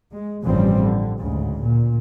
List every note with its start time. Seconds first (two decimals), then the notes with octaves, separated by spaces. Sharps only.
0.14 G#3
0.44 A1 G2 C#3 F3 G3 C4
0.81 D3
1.19 D2 G#2 C#3
1.63 A#2